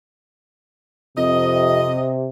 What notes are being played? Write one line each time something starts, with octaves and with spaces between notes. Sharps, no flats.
F2 C3 D#5